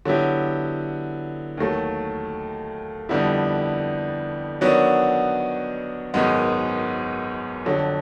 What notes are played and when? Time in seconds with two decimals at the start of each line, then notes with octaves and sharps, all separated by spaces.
0.05 D3 F#3 B3 E4 G4
1.57 D#2 D#3 F#3 A3
3.09 F2 D3 G3 B3 E4
4.61 D#3 F#3 B3 D4 F#4
6.14 G#1 F#2 D#3 G#3 B3
7.65 F2 D3 F#3